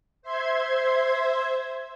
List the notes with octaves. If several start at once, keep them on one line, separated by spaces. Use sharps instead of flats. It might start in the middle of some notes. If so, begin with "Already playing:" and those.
C5 E5 C6 G#6